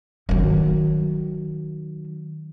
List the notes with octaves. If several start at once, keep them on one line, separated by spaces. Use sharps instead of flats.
D#3 F#3